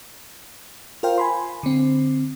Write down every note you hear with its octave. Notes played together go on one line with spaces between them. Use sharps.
F4 A#4 C5 F5 G5
G#5 B5 C6
D3 C4